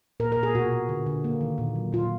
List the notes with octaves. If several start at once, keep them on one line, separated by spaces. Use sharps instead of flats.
A#2 A#4
A#4
A#2
G#4
B2 F#4
B2
D3
D3
A#3
D#3
A#2
F#3
A#2 F4